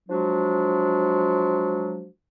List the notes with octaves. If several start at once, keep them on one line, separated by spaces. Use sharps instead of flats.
F3 F#3 G#3 D4 F#4